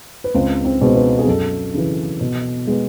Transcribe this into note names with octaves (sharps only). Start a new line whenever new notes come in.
B4
C#2 C4 C5
C4 C5
B2 G#3 B3 C5
B3 B4
G#4
F#2 A4
C#3 E3
B2
G#3 B3